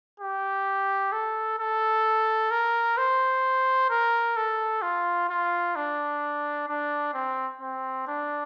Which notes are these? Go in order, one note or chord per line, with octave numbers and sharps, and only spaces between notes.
G4
A4
A4
A#4
C5
A#4
A4
F4
F4
D4
D4
C4
C4
D4